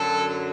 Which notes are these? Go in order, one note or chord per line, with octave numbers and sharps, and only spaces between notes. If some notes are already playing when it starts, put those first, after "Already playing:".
Already playing: F#2 D3 F#3 A4